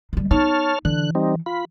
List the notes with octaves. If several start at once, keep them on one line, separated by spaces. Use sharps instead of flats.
D3 G3
B3 D#4 C#5 A5 F6
D3 E3 F#6
G3 C4 D#4
F4 B5